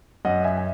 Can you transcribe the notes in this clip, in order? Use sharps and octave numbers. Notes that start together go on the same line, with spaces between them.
F#2 D#5 F#5
E5 G#5
G#5